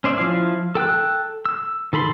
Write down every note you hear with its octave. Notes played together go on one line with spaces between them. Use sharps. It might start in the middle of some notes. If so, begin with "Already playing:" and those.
C#4 C5 D5 E5
F3 E4 F5
A4 G5 E6 F#6
E6
D#3 A4 B5 C6